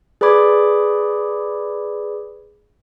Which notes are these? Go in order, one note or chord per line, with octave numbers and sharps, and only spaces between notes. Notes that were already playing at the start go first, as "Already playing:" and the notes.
G#4 B4 D5 B5 D6 G#6